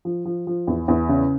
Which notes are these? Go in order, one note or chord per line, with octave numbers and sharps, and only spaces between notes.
F3
F3
F3
E2
E2
C#3